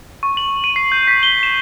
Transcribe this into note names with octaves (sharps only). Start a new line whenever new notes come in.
C#6
F#7
D#7
C7
G6
B6
G7
E7